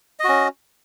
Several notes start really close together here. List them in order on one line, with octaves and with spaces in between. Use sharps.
D#5 F#4 C#4